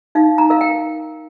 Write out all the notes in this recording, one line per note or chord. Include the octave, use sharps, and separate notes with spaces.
D#4 F5
A#5
A#4 F5
G5